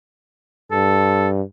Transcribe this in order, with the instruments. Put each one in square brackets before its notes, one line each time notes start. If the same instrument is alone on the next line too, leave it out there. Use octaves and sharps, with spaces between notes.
[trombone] G2 [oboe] A4